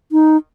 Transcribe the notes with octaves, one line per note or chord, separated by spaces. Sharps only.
D#4